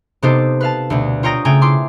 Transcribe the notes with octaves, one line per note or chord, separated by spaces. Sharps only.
C3 B3 D#4 G4 A4 C5
B4 F5 A5
D2 B2
F4 C#5 G5 A#5 D#6 A#6
C#3 A3 G5 G#5 A#5
E4 F4 C6 D6